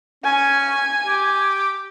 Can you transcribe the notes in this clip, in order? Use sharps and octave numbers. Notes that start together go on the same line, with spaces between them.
C#4 G#5
G4